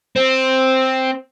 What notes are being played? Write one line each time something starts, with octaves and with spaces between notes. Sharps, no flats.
C4